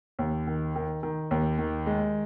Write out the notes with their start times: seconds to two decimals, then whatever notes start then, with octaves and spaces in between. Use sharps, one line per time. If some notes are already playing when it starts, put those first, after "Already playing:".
0.19 D#2
0.47 D#3
0.76 D#3
1.03 D#3
1.31 D#2
1.59 D#3
1.86 G#3